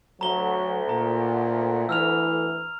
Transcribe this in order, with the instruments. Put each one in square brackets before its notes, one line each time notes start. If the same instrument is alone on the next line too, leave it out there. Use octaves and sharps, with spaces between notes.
[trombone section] D2 [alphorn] F#3 [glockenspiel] A#5 G7
[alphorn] A#2 [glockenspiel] A#5
[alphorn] E3 [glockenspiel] E6 F6 F7